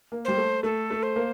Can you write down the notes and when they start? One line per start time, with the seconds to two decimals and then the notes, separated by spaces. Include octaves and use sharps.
0.12 A#3
0.25 G3 C5
0.37 A3
0.63 A3 A4
0.91 A3
1.03 C5
1.16 A#3